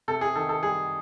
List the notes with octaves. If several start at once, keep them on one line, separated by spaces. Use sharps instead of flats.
C3 A4
G#4
D#3 A4
A4
G3 G#4